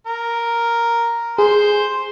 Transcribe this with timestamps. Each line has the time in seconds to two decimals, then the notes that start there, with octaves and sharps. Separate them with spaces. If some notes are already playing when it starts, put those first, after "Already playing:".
0.06 A#4
1.38 G#4 C5